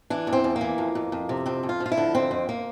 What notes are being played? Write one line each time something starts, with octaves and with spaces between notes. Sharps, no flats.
E3 D4
E2
C4
E2
A#3
E3
F2
F2
F2
C3
F2 C4
F2
F4
F3
F4
E4
D3
F2 C4
F2
A#3